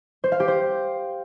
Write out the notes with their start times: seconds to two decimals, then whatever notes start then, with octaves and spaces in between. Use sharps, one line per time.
0.24 C5
0.32 F5
0.40 G4
0.48 C5